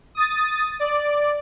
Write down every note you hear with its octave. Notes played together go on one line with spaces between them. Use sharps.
D#6 A6
D5